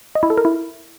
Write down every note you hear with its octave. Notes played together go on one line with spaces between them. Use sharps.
D#5
E4
A4
A#4
E4